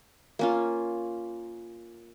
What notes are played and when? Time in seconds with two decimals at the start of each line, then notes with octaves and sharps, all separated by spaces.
0.39 A#3 C#4 F4